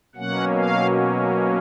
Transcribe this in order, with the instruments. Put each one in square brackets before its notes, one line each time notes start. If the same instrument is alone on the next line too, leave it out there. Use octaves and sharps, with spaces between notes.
[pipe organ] B2 F#3 A#3 C#4 F#5
F5